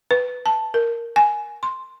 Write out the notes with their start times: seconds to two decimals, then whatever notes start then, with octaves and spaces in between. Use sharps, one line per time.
0.11 B4
0.46 A5
0.74 A#4
1.16 G#5
1.63 C6